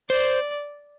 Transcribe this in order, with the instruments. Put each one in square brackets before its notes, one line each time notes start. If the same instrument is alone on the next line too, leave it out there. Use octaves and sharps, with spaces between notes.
[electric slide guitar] C5 [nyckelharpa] D5